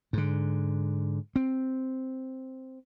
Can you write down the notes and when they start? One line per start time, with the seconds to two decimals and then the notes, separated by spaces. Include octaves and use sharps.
0.13 G#2 D3
1.36 C4